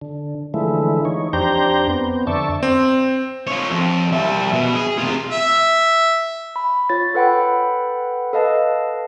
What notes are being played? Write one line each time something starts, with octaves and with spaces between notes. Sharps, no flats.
D3
D3 E3 F3 G#3 A3 E4
E3 D#4 C#5
F2 D4 G4 C5 A#5 G6
B3 C4
F2 D3 D5 E5 A5 C#6
C4
F4 C#5
F2
G3 E5
B2
G#4
C3 F4
E5
B5
F4 C#5 A6
A4 B4 F#5 G5 B5
A4 B4 D#5 F5 A5